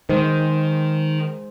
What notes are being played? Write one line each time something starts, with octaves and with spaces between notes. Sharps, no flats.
D#3 G#3 C5